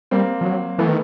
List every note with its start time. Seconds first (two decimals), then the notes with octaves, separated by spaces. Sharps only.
0.11 G3 A#3 C4
0.41 F3
0.45 F#3
0.78 E3 A3 B3
0.88 D#3